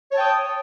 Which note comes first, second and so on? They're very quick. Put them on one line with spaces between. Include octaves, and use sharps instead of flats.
C#5 A5 G5 D#6